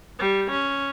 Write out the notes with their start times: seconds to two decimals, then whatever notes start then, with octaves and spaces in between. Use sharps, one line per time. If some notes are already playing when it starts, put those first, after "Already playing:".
0.19 G3
0.50 C#4